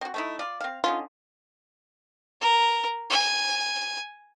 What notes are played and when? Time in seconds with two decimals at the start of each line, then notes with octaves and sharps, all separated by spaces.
0.01 C4 F#4
0.14 A3 D#4 E4
0.39 F4 D5
0.60 C4 F5
0.84 D3 C#4 D#4 F4
2.41 A#4
3.10 G#5